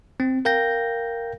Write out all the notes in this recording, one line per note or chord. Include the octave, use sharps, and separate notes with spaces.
C4
A#4 F5 G5 G6 A#6